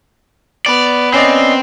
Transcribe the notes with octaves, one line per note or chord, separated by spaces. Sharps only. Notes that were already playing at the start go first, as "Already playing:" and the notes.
B3 D5
C4 C#4 D5 D#5